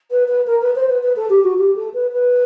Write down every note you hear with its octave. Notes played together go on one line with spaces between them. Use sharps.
B4
B4
A#4
B4
C5
B4
B4
A4
G4
F#4
G4
A4
B4
B4